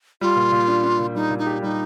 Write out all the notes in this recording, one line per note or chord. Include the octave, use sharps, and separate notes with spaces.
G3 F4
A#2
A#2
D4
D4
A#2
G3 D#4
A#2
D#4
G4
G3 D#4